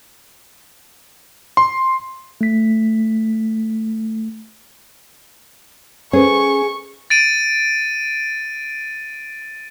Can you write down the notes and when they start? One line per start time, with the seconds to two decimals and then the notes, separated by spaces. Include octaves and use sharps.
1.57 C6
2.41 A3 B6
6.13 C#4 G#4 A4 B4 C5 C#6
7.10 A6 D7 D#7